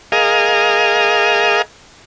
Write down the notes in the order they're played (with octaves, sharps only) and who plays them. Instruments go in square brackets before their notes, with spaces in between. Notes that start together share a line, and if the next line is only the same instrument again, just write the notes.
[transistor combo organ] G#4 A#4 D#5 F5